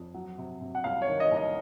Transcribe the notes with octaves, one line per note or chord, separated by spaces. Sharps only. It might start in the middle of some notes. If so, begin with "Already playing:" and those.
Already playing: F2
F#3
C3
C3
F#5
C2 F5
C#5
D#3
D#5
C2
D#5